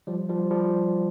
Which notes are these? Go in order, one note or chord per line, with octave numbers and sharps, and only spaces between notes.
F3 G3
F3 G3
F3 G3